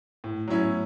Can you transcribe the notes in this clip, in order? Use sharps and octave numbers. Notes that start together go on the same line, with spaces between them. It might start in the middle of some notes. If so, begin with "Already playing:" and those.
A2
F#3 C#4 E4